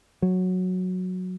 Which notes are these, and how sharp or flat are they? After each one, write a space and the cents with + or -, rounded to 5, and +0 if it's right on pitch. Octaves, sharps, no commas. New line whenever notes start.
F#3 -10